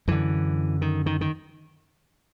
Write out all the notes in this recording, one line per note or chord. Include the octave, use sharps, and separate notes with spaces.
F#2 D3 E3
D#3
D#3
D#3